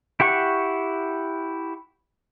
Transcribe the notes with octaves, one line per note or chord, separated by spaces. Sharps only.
E4 G4 F#5 C#6